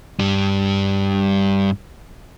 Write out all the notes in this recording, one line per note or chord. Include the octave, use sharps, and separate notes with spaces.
G2 G3